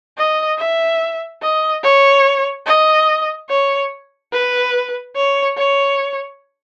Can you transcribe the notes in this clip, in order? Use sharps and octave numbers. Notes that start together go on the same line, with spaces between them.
D#5
E5
D#5
C#5
D#5
C#5
B4
C#5
C#5